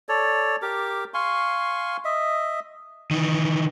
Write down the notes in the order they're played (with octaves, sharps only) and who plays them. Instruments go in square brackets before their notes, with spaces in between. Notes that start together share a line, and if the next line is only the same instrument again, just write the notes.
[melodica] A4 C#5 D5
G4 A#4 D6
F5 G#5 C6 C#6
D#5 E5
[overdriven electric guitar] D#3 E3